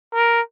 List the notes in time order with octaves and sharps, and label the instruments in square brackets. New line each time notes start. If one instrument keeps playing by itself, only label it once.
[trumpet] A#4